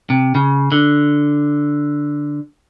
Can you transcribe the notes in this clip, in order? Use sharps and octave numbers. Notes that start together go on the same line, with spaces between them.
C3
C#3
D3